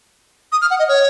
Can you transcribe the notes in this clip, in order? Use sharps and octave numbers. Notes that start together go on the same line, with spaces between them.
D#6
F6
F#5
D#5
C#5